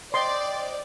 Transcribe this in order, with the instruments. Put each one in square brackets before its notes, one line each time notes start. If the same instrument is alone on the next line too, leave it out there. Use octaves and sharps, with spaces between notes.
[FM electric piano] C5 D#5 G5 [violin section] D5 [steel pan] C6